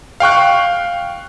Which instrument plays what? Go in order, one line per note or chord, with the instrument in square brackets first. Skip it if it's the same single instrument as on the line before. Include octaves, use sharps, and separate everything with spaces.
[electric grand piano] F5 G5 C#6 F#6